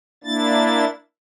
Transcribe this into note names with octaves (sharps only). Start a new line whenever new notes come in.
A#3 D4 E4 A6